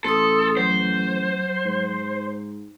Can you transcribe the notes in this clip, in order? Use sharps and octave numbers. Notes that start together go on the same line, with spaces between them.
A1 A4 C6 D#6
F#3 C5
G#2